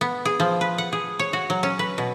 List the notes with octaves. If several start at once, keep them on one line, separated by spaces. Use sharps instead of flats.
B3
G#4
F3
B4
F#5
G#4
C#5
F#4
F#3
C#4
B4
B2